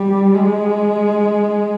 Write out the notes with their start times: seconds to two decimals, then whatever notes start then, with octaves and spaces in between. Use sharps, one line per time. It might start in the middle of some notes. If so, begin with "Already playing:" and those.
Already playing: G3
0.35 G#3